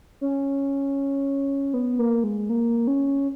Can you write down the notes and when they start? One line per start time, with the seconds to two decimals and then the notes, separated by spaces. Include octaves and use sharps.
0.21 C#4
1.74 B3
1.99 A#3
2.24 G#3
2.49 A#3
2.87 C#4